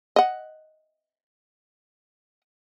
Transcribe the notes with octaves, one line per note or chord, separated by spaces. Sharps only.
D#5 F#5